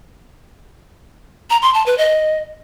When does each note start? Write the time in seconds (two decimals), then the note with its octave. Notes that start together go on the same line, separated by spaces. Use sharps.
1.50 A#5
1.62 C6
1.74 A5
1.86 B4
1.98 D#5